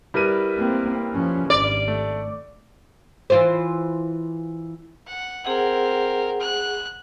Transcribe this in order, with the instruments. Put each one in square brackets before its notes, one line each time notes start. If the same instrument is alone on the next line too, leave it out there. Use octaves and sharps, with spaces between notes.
[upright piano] G3 D#7 [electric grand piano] E4 A#4 B4
[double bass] A#3 C4
F3 C#4
[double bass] G#1 [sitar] D5
[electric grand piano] A3
[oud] E3 F4 C5
[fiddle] F#5
[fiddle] C4 A#4 [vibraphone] G#4 F#5
[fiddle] F#6